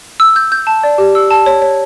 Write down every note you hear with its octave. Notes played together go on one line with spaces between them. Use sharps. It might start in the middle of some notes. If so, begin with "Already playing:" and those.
E6
G6
G6
A5
D5
G4
E6
A5
C#5
C#5